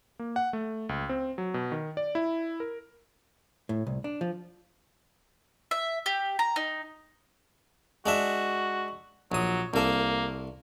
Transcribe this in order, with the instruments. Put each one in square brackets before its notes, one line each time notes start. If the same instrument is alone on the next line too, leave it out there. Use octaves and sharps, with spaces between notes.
[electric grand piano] A#3
F#5
A3
C#2
C4
F#3
B2
D#3
D5
E4
A#4
[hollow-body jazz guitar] A2
C2
D4
F3
[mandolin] E5
G4
A#5
D#4
[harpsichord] G#3 D4 E5 [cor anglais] F#4
[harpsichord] A#1 D#6 [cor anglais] F#3
[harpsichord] C2 A4 [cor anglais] A#3